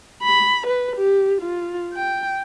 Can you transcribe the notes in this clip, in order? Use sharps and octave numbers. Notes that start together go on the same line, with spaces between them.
B5
B4
G4
F4
G5